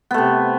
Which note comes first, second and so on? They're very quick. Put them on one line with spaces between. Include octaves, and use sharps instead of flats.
B3 A3 C3